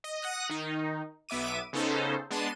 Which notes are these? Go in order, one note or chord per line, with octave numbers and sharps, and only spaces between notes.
D#5
F#5 D#6 F#6 A#6
D#3 D#4
B1 B3 E5 D6 D#7
C#3 B3 C#4 D#4 A4 C5
G#3 B3 D4 A5 C6 D#7